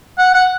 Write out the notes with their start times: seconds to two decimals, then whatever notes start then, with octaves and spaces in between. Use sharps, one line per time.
0.19 F#5
0.34 F#5